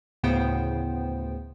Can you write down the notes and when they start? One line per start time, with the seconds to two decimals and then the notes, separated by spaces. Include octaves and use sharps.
0.23 D2 A2 C#3 B3 C5 G5